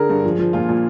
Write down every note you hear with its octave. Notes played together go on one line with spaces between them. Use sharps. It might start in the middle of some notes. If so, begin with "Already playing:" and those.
Already playing: D3 G#4 A#4
G2
F3
F3
A#2 F4
A#2